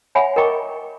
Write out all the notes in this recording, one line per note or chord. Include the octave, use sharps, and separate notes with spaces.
C#5 E5 F#5 G#5 B5
A#4 D#5 G5 A#5 C#6 D6